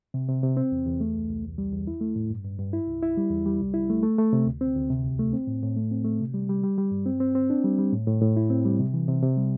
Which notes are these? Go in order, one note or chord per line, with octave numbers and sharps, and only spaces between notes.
C3
C3
C3
C4
E2
E2
A3
C2
C2
E2
G3
E2
E4
A3
A2
G2
G2
G2
E4
C2
E4
G3
E2
G3
C2
E4
A3
A3
A3
C3
D2
C4
D2
C3
C2
A3
C4
A2
A2
A3
C4
A3
C3
G3
G3
G3
G3
G2
C4
C4
C4
D4
G3
G3
A2
A2
A2
E4
C4
G3
C3
E3
C3
C3
G3